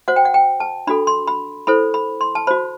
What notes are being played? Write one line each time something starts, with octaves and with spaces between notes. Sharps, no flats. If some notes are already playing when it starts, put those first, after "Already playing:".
F#4 C5 F#5
G5
F#5
G5
A5
D4 F#4 A4 B5
C6
B5
E4 A4 C5 B5
B5
C6
A5
F#4 C5 B5